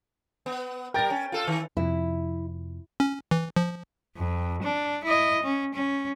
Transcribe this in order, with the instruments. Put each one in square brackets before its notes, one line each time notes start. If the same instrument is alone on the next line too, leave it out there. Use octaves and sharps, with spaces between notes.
[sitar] B3
[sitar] G3 A#4 [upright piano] G5 A6
[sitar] C#4
F4 A4
D#3
[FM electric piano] F2 C3 F3 [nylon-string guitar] E4
[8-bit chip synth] C#4
E3
F3
[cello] F2
D4
E4 D#5
C#4
C#4